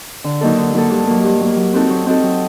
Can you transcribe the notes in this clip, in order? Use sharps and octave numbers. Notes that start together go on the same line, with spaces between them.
D3
F#3 A#3 D#4 A4
D3
F#3 A#3 D#4 A4
G2
F#3 A#3
G2
F#3 A#3
F#3
C4 D#4 F#4 A4
F#3
C4 D#4 F#4 A4
F#3